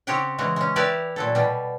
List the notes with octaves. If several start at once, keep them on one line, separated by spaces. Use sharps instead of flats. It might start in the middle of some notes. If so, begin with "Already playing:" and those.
C#3 C4 G4 C#5 F#5 G5
C#3 E3 G#3 F#4
G#3 C#4
E4 G4 A#4 B4 D5 E5
A#2 F#3 A4
B2 G3